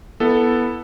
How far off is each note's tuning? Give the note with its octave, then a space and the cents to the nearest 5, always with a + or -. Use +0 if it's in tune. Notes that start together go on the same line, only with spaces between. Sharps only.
B3 -10 E4 +0 A4 +0